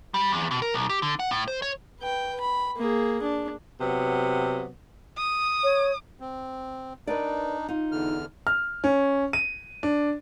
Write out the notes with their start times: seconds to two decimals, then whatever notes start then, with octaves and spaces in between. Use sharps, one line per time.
0.14 G3
0.33 E2
0.51 B2
0.62 A#4
0.74 B1
0.89 G4
1.02 D3
1.19 F#5
1.31 A2
1.48 C5
1.62 C#5
2.00 B4 G5
2.40 B5
2.77 A#3 G#4
3.22 D4
3.80 C3 F#3 B3
5.18 D#6
5.63 C#5
6.20 C4
7.07 D4 D#4 A#4 B4 D5
7.68 D#4 F4
7.92 E2 D3 F6
8.47 F6
8.84 C#4
9.33 D#7
9.83 D4